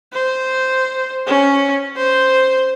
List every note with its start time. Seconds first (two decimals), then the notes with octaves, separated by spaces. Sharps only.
0.13 C5
1.27 C#4
1.97 C5